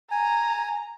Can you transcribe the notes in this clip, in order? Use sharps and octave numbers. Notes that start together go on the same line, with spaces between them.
G#5 A#5